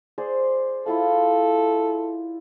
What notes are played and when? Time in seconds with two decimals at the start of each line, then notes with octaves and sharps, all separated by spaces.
0.18 G#4 C5 D5
0.86 E4 F4 A4 F5